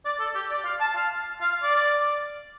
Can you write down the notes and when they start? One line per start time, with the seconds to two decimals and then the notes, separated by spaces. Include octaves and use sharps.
0.05 D5
0.20 A4
0.35 G4
0.51 D5
0.65 F5
0.80 A5
0.96 F5
1.41 F5
1.63 D5